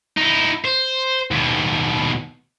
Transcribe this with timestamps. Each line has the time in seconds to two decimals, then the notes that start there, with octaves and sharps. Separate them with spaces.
0.18 D#4 E4
0.65 C5
1.31 D#2 B2